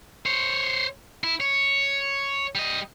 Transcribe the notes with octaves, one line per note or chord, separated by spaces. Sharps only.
C5 C#5
E4
C#5
G3 D#5